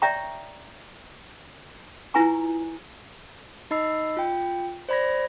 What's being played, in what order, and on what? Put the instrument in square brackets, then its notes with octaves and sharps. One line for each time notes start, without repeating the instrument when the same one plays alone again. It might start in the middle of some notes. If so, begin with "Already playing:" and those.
[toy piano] C#5 D5 E5 G5 A#5 C#6
E4 F4 B4 G#5 A#5 C#6
[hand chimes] D#4 D#5 B5 E6 C7
F4 G5
C5 D5 B5 G#6 A#6